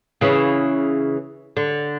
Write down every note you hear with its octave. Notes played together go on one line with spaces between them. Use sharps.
C#3 E3
D3